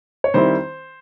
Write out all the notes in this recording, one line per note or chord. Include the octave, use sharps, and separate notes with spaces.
C#5
D#3 G3 C4 E4 C5